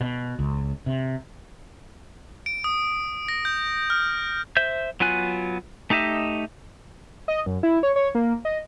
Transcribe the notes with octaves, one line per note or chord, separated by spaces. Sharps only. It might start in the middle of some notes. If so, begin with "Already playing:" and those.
B2
C#2
C3
D7
D#6
A#6
G6
F6
C5 E5 G6
F#3 B3 F4 G#5 F#6
A3 D#4 G4 D#5 E5
D#5
F#2
E4
C#5
C#5
A#3
D#5